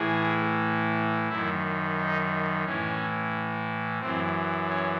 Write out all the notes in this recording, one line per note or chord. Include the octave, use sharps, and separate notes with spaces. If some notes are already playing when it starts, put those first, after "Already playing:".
Already playing: A2 E3 G#4
F#2 D#3 E4
D#4
A2 E3 C#4
F#2 E3 C4
C#4